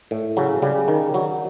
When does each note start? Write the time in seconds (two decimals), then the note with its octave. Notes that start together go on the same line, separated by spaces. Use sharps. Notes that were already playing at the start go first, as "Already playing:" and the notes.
0.11 A2
0.37 C#3 F#3
0.62 C#3 G3
0.88 D#3
1.14 F#3